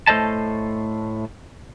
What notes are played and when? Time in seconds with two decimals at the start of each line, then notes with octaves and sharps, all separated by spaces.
0.07 A2 A3 A4 C5 D#5 A5